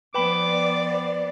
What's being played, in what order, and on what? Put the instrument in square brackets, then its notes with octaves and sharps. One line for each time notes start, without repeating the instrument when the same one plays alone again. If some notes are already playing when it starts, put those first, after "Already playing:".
[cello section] F3 B3 C5 [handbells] B4 G5 B5 [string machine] D5 [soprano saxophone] D6